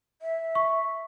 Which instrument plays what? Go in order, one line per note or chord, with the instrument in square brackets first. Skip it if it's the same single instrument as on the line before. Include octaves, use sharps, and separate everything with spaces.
[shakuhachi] E5
[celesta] C#6